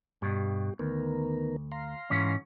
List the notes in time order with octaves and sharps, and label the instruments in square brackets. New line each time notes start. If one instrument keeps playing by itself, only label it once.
[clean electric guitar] G2 B2 [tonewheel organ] G4
[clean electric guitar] D2 [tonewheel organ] D#3 B3 A#4
[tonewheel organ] F5 A#5 C6
[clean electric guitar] G#2 E3 C#4